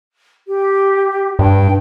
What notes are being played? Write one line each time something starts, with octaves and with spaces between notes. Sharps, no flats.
G4
G2 G5